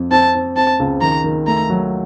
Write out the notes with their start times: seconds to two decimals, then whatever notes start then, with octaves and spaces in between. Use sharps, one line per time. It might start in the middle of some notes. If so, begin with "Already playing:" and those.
Already playing: F2
0.11 C4 A5
0.35 C4
0.57 C4 A5
0.80 C#2
1.01 D#3 A#5
1.24 D#3
1.47 A3 A#5
1.70 F#3